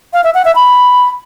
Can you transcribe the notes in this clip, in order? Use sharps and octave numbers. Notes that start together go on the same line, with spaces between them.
F5
E5
F#5
E5
B5